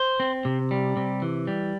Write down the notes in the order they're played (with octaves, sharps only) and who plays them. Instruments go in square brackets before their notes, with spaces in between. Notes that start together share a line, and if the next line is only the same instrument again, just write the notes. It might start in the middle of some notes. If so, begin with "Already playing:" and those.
Already playing: [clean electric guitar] C5
C4
C3
G3
C3
E3
G3